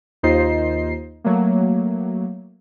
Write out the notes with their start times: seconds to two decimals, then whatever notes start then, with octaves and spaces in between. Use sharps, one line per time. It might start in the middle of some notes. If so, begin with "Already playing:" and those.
0.23 D#2 D#4 F4 C5 D#5 C7
1.24 F#3 A3 A#3